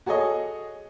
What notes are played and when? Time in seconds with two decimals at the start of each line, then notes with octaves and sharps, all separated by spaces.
0.06 F#4 G#4 A4 C#5 D#5